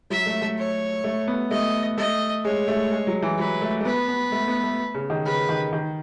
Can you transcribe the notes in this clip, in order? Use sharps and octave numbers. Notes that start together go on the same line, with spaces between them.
F#3 E5
A3
A3
C#5
A3
B3
A3 D#5
A3 D#5
G#3 C#5
A3
G#3
F#3
E3
F#3 B4
A3
A3
B3 B4
B3
A3
B3
A3
C#3
D#3
C#3 B4
D#3
D#3